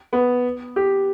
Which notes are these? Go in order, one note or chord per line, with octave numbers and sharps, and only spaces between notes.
B3
G4